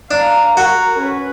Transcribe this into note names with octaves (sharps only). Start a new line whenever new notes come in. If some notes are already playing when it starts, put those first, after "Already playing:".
D4 F5 A#5
F#4 A#4
C#4 B4